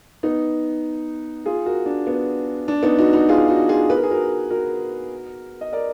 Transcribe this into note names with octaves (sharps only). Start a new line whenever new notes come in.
B3 D#4
F4 G#4
F#4 A#4
D4
B3
D4
B3 D#4
D#4 F#4
D#4 F#4
F4 G#4
D#4 F#4
F4 G#4
B4
A#4
G#4
F#4 A#4
F#4 A#4
D#5
A#4 D5